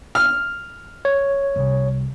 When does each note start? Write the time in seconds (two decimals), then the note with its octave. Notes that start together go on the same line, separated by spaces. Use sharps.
0.15 F6
1.05 C#5
1.56 C2